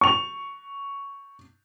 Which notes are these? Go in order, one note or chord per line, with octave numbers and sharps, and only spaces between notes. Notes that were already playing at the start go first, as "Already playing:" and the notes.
C#6 F7